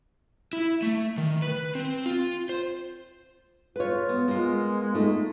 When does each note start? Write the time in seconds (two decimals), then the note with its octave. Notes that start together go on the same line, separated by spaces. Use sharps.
0.53 E4
0.82 A3
1.18 D#3
1.42 B4
1.75 C4
2.06 F4
2.49 C5
3.76 F4 B4 C#5
4.09 B3
4.28 G#3 A#3 B3 F4
4.95 A3 D#4